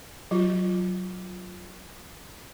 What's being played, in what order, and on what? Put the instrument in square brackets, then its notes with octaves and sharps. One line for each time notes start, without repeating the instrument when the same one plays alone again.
[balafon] F#3 F4